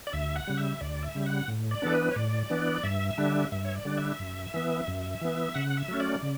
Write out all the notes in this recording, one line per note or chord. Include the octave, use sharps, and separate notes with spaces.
D5
D2 E5
F#5
C#3 G3
E5
D2 D5
E5
C#3 G3
F#5
A2
D5
E3 B3 D4 A4
B4
C#5
A2 D5
E3 B3 D4
G2 E5
D3 G3 D4
G2 E5
C#5
D5
D3 G3 D4
E5
F#2
E3 B3
F#2
E3 B3
C#3 F#5
E5
F#3 A3 C#4
D5
C#3